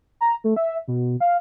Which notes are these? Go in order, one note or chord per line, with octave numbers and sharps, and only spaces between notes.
A#5
A3
E5
B2
F5